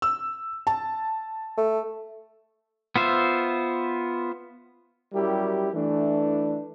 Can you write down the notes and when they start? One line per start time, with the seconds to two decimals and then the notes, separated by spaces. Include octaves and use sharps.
0.02 E6
0.67 A5
1.58 A3
2.96 B3 F4 C5 E5
5.13 F#2 G3 E4 F#4 G4 A#4
5.73 E3 A3 D4